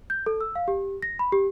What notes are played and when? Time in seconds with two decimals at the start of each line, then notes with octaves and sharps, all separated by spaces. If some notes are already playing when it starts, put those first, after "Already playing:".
0.10 G6
0.26 A4
0.41 E6
0.55 F5
0.68 G4
1.02 A#6
1.19 B5
1.32 G4